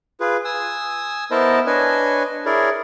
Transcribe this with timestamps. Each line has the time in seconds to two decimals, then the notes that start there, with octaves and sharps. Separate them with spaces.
0.20 F4 G#4 B4
0.45 G#5 D#6 E6
1.31 B3 E4 A#4 C5 D#5 A5
1.67 D4 B4 C#5 D#5 G#5
2.46 E4 G#4 A#4 C#5 D5